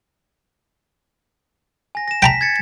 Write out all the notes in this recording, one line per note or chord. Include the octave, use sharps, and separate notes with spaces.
G#5 A#6
A#6 E7
G5 A5 A#5 B6
G#6 A6 C#7